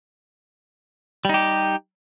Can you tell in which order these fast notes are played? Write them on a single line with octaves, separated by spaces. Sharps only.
G3 D#4 G4